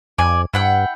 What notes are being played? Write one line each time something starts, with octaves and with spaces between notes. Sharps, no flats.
F2 D5 G#5
G2 E4 F#5 G5